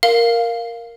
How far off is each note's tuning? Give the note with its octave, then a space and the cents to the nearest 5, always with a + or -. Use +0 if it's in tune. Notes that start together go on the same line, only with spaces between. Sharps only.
A#4 +0 F5 +0